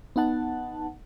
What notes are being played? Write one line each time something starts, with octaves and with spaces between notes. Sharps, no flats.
B3 D#4 F#5 A5